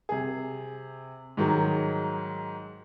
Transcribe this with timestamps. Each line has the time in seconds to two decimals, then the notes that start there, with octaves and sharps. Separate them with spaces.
0.09 C3 G#4
1.37 G#2 D#3 F#3 G#3